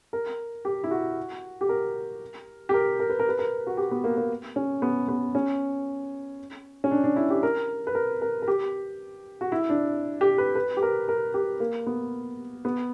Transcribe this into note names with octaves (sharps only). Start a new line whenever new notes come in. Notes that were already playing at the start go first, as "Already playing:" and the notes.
A#4
G4
E4
F#4
G4
A#4
G4
A#4
A#4
B4
A#4
B4
A#4
F#4
G4
B3
A#3
A#3
C#4
B3
B3
C#4
C#4
D4
D4
E4
G4
A#4
B4
A#4
A#4
A#4
G4
F#4
E4
D4
G4
B4
B4
G4
A#4
A#4
G4
A#3
B3
B3